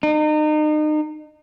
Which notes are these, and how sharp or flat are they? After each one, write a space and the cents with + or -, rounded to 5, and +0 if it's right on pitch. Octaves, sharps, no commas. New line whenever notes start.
D#4 -35